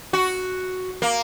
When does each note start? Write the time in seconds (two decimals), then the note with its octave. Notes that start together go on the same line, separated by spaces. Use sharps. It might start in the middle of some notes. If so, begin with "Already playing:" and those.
0.13 F#4
1.02 A#3